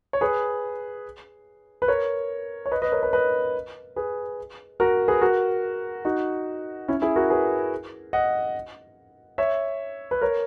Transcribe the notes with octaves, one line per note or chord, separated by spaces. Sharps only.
C#5
G#4 B4
B4
A#4 C#5
C#5
B4 D#5
B4 D#5
A#4 C#5
B4 D#5
B4 D#5
G#4 B4
F#4 A#4
G#4 B4
F#4 A#4
D#4 F#4
C#4 E4
E4 G#4
F#4 A#4
G#4 B4
D#5 F#5
C#5 E5
B4
A#4 C#5